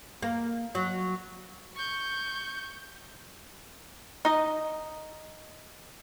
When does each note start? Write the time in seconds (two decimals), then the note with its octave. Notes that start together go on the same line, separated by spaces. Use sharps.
0.23 A#3
0.75 F#3
1.76 C#6 G6
4.25 D#4 D#5